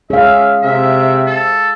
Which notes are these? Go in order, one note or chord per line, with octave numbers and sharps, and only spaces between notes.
C#4 G#4 E5 F5
C3 E5
A4